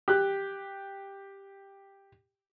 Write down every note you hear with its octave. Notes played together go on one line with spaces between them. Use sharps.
G4 F#6